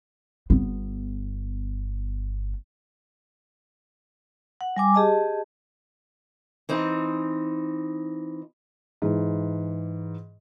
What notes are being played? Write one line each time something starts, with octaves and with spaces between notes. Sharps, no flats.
G1 B3
F#5
G3 G#5 D6
G4 G#4 D#5 A5
E3 C4 D#4
G#2 E3